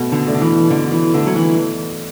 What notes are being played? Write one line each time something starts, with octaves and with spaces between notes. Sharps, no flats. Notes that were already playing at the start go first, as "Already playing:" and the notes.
Already playing: B2 A3
D3
A3 D4
D3
E3
B2 D3
E3
D3 A3 D4
F#3
E3